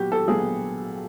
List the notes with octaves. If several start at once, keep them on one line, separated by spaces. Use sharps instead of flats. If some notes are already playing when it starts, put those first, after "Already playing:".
Already playing: A#2 F#3 B3 F#4 G4
A4
A#1 A#2 F#3 B3 G#4